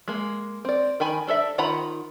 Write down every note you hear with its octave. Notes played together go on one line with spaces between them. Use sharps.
G#3 A#3
C4 D5
D#3 G5 G#5 B5
D4 A4 D5 E5
D#3 F4 F#5 A#5 B5